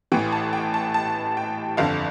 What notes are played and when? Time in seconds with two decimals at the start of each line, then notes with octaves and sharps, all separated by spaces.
0.12 A1 A2 E3 G5
0.32 A5
0.53 G5
0.74 A5
0.94 A5
1.37 G5
1.77 G1 F2 D3 F5